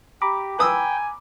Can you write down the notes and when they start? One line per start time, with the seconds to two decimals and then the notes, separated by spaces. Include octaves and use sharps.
0.22 G4 A#5 B5 D6
0.59 B4 G5 G#5 D#6 E6